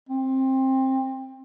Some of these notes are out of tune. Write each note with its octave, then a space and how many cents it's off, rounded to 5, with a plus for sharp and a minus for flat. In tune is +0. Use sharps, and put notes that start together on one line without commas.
C4 +20